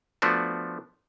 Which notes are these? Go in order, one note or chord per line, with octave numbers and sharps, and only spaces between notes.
F3 A3 B3 D4 F#4